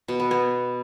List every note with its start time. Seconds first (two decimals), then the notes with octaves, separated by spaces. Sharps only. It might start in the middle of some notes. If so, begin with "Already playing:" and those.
0.08 B2
0.20 B3
0.31 B3